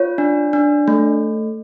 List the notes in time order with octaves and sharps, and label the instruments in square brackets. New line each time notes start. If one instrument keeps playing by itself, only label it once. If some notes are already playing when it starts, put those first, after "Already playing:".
Already playing: [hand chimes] F4 C#5
D4
D4
A3